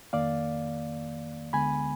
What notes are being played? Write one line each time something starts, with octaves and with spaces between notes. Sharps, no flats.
F2 D#3 A#3 D5 F5
D2 D3 G#3 B3 G#5 B5